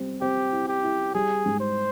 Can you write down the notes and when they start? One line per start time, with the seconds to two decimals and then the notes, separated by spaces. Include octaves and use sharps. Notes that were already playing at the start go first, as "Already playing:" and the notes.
Already playing: G3 C4
0.21 C4 G4
0.52 E4
0.68 G4
0.83 E4
1.14 G3 G#4
1.46 G#2
1.60 C5